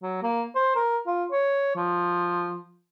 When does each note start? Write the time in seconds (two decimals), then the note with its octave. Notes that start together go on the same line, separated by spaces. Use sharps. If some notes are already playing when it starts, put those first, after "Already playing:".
0.03 F#3
0.23 A#3
0.55 C5
0.76 A#4
1.06 F4
1.32 C#5
1.76 F3